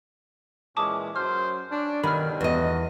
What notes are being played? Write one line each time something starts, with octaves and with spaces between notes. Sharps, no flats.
A#2 E3 G#3 C#4 A5 D6 D#6
F#2 F#3 C5 F6
C#4 D4
B2 D#3 F#3 G3 F4 B5 F6
E2 F#4 D#5